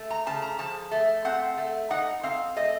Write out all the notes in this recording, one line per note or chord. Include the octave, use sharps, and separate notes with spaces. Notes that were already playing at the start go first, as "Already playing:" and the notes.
Already playing: A3
A#5
C#3 A5
A#5
F3 A5
A3
C4 F#5
A3
D#4 F#5
C4 F5
A3 D#5